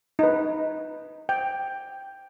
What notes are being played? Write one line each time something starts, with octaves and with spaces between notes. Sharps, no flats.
D#4 B4
G5